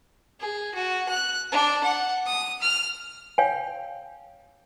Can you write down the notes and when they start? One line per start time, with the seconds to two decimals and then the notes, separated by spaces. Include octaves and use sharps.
0.40 G#4
0.74 F#4
1.08 F#6
1.52 D4
1.84 F#5
2.26 D#6
2.61 F6
3.38 C#5 F5 G5 G#5